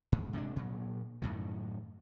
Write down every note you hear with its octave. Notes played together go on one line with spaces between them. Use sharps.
G#2
C3 G#3 A#3 D4
A#2 F#3
F#2 A2 D#3